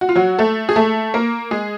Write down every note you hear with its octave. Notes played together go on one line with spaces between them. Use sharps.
F#4
F4
F#3 F#4
A3 A4
G#4
A3 A4
A#3 A#4
G#3 G#4